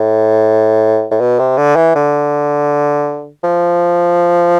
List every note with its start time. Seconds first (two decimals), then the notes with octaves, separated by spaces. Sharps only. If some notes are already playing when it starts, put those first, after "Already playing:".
Already playing: A2
1.11 A2
1.21 B2
1.39 C3
1.57 D3
1.76 E3
1.95 D3
3.44 F3